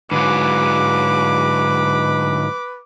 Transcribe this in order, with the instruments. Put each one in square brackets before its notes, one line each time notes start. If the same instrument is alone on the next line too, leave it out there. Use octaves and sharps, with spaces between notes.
[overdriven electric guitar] G#2 [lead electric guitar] D3 F#3 [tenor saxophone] B4 [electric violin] D6